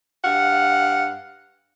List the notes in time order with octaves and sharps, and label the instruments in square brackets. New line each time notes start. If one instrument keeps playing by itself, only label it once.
[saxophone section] G2 F5 F#5